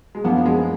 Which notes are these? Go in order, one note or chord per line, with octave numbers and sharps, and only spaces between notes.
G#3
F#2 F3 A#3 B3 D4
G#3